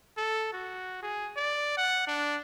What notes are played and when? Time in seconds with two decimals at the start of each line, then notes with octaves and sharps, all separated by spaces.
0.17 A4
0.53 F#4
1.03 G#4
1.37 D5
1.77 F#5
2.07 D4